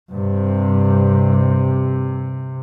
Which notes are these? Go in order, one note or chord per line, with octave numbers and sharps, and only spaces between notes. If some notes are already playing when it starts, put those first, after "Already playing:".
G2 C3